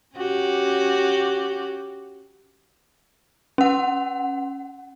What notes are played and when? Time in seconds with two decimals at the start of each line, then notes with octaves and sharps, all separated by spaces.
0.17 C#4 F#4 G4
3.58 C#4 F#5